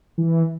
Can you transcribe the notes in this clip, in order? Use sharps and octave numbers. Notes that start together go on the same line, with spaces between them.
E3